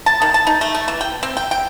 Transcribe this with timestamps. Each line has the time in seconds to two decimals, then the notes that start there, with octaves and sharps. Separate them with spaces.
0.06 A5
0.22 D#3
0.34 A5
0.47 D#4
0.61 A3
0.74 A3
0.88 E3
1.01 G5
1.23 C4
1.37 G5
1.51 G5